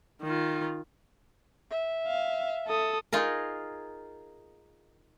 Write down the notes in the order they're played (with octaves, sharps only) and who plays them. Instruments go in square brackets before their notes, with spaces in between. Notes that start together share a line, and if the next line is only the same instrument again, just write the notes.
[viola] D#3 F4
[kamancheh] E5
[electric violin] F5
A4 D#6
[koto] D#4 F4 G#4 A#4